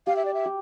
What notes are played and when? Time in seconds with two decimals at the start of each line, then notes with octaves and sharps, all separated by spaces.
0.07 G4 F5
0.16 E5
0.25 D5
0.34 E5
0.46 G4